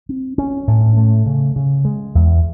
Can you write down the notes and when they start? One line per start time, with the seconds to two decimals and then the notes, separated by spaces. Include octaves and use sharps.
0.09 C4
0.38 C#4
0.67 A2
0.97 A3
1.26 C#3
1.56 C#3
1.85 G#3
2.15 E2